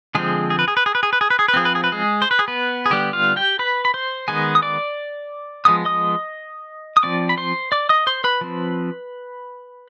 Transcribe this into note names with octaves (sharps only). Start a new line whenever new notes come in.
D3 F3 G#3 C4 G#4
G#4
B4
G#4
B4
G#4
B4
G#4
B4
G#4
B4
G#4
B4
F3 C4 G#4
B4
G#4
B4
G#3 G#4
C5
B4
G#4
B3 B4
G#4
D3 G3 B3 G4
F4 F5
G4 G5
B4 B5
B5
C5 C6
D#3 G#3 B3 G#4 G#5
D#6
D5 D6
F3 G#3 B3 D#6
D#5 D#6
D#6
F3 C4 D5 D6
B5
C5 C6
D5 D6
D#5 D#6
C5 C6
B4 B5
F3 C4